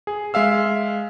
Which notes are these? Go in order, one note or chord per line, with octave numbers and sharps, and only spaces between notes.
G#4
G#3 E5 F5 E6